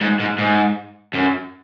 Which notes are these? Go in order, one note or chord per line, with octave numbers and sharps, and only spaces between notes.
G#2
G#2
G#2
F#2